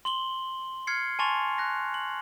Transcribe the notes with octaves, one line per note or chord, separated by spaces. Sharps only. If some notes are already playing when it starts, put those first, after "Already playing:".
C6 F#7 G7
F6 G#6 C7 C#7
G#5 A5 C6 C#6 A6 F7
F#6 A#6
F#7